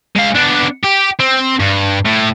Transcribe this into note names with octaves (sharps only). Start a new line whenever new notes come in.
G#3 F5
B3 D4
G4
C4
G2
A2